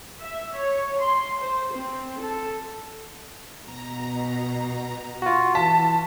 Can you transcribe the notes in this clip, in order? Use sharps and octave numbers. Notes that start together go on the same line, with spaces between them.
E5
C#5
C6
C5
C4
A4
B2 A#5
F4 F#4
E3 A5 B6